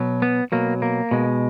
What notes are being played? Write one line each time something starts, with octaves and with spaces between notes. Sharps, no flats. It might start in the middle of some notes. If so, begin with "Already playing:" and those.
Already playing: B2 F#3
B3
B2 F#3 A#3
A#3
B2 G#3